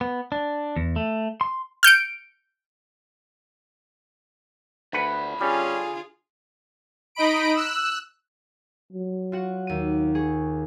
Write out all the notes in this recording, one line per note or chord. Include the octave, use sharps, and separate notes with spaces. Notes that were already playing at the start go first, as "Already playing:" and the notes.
B3
D4
E2
A3
C6
F6 G6 C#7 D7
D2 D3 B4 F#5 B5
G3 C#4 F4 G#4
D#4 D#5 B5 D7
E6 F#6
F#3
F4 F#4 F#5
D#2 D#7
G#4 C#6